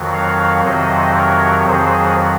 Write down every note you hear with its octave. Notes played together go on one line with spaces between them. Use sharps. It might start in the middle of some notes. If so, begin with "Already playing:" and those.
Already playing: F2 D#3 F#3
C#5 F5
F2 C3 D#3 F#3 C5 D#5
A#4 C#5
F2 D#3 F#3 G#4 C5